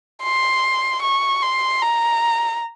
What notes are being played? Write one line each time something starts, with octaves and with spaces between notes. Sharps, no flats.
C6
C#6
C6
A#5